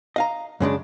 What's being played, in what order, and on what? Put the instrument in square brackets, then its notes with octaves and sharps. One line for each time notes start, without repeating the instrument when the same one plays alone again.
[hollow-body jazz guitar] D#5 F5 A#5
F#2 C#3 G#3 D4